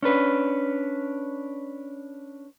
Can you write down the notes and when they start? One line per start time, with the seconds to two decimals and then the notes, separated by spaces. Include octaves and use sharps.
0.03 C#4 D4 B4